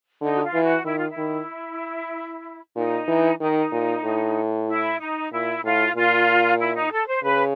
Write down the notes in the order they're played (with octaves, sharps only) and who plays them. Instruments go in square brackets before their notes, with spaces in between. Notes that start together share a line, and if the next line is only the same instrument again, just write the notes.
[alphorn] D3 [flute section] D#4
[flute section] F#4
F4
[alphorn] E3
[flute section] F#4
[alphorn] D#3 [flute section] E4
[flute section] F4
E4
[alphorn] D#3
[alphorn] A#2 [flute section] D#4
[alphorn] E3
[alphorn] D#3 [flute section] D#4
[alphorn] A#2
A2
[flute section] E4
D#4
[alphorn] A#2 [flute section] E4
[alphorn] A2 [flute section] F4
[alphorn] A#2 [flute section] F4
[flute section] E4
D#4
A4
C5
[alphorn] C#3 [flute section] B4